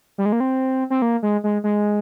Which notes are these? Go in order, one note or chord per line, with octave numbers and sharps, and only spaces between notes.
G3
G#3
A#3
C4
C4
A#3
G#3
G#3
G#3